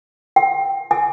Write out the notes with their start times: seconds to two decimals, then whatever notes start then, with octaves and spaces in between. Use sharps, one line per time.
0.36 G5
0.91 G#5